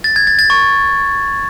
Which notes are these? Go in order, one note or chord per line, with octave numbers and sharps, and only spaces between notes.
A6
G#6
A6
A6
C#6